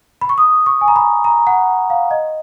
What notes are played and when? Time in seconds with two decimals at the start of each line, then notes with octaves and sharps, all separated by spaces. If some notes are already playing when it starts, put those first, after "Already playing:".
0.21 B5
0.29 C#6
0.38 D#6
0.66 C#6
0.81 G#5
0.88 A#5
0.96 B5
1.24 A#5
1.47 F#5
1.90 F5
2.11 D#5